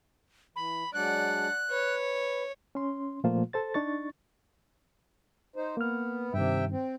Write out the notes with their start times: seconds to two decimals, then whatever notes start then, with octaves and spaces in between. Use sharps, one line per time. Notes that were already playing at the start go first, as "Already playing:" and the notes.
0.56 E3 B5
0.94 F#3 G#3 D4 D5 F#5 F#6
1.71 B4 C#5
2.75 C#4 C6
3.24 A#2 F3 A3 A#3 F4 C5
3.53 A4 C5 A6
3.74 D4 D#4 C#6 A6
5.56 D#4 C5
5.77 A#3 B3 F6
6.34 G2 C3 D#3 E5 G5
6.71 C4